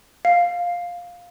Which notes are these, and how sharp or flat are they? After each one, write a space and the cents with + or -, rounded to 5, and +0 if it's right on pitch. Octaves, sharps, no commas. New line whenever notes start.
F5 +10